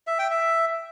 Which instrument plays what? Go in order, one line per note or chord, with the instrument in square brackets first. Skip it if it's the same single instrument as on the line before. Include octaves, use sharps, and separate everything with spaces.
[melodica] E5
G5
E5